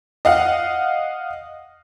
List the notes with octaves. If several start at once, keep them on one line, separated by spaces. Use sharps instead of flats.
D#5 F5 F#5